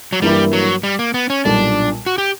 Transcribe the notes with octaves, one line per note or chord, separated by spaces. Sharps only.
F#3
G2 E3 G3 A#3 E4
F#3
G3
A#3
B3
C#4
B1 A#2 G3 D4
F#4
G4